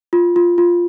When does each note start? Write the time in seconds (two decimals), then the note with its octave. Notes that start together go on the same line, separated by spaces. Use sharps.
0.13 F4
0.36 F4
0.58 F4